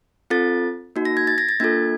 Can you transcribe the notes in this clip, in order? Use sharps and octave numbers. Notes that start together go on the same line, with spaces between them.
C4 F4 A4 A6
A#3 D#4 F#4
A#6
G#6
A6
A#6
A6
A#3 D4 F4 A4 G#6